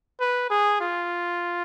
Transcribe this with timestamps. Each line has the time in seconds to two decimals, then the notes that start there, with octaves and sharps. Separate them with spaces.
0.20 B4
0.50 G#4
0.80 F4